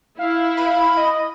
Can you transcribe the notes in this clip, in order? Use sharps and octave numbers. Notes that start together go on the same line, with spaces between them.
E4 F5
B5
D#5